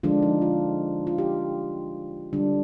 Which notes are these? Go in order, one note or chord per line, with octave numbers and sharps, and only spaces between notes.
D3 F3 G#3 D4 F4
D#4
F4
F4
G4
D3 G3 D4